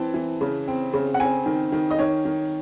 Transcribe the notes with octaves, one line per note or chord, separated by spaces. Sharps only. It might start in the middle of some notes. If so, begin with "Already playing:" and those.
Already playing: E3 C4 A5
E3
C#3
C4
C#3
F#5
C4 G#5
D#3
D#3
D#5
D#3 C#5
D#3